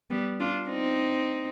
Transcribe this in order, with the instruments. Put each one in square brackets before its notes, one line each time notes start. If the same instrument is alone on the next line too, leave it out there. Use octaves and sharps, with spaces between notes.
[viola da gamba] G3 B3
D4 F4
C4 D#4